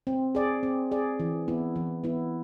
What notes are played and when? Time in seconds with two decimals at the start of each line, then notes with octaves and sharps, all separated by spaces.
0.07 C4
0.35 G#4 D5
0.63 C4
0.91 G#4 D5
1.20 E3
1.48 B3 E4
1.76 E3
2.04 B3 E4